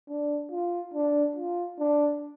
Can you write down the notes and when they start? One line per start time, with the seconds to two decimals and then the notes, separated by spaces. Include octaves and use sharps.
0.08 D4
0.51 F4
0.94 D4
1.36 F4
1.79 D4